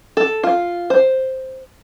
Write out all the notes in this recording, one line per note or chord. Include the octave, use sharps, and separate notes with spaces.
A4
F4
C5